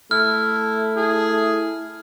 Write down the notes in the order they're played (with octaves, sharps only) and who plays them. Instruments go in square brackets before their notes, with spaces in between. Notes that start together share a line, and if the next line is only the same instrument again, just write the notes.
[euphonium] A3 [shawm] E4 [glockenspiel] F6
[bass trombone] E4 [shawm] G#4